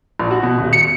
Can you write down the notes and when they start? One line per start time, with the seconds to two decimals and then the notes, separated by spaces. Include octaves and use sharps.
0.19 A#1
0.31 F#4
0.43 B2
0.58 D#1
0.73 C#7